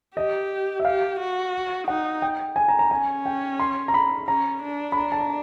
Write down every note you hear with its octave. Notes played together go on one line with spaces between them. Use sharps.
G4 D#5
E5
G4 F5
F#4
D#4 F#5
G5
G#5
A#5
A#5
C#4 G#5
G5
C6
A#5
B5
C#4 A#5
D4
B5
D4 A#5
A5
A#5